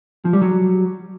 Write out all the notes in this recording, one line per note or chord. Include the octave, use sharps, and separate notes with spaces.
F3
G3
F#3